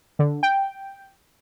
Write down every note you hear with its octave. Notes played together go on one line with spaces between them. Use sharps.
D3
G5